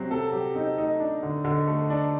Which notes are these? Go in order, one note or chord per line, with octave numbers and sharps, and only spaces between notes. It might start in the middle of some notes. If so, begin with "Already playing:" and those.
Already playing: C3 F#3 C4
C3 A4
F#3 G4
C4 D#4
A3 D#4
D4
D3
D3
A3
D4